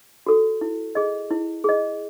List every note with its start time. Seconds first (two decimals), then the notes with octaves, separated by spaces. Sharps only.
0.26 F#4 A4
0.61 E4
0.95 G#4 D#5
1.30 E4
1.64 G#4 D#5